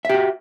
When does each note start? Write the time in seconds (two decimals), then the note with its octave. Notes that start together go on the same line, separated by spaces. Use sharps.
0.05 E5
0.09 G4
0.14 F#4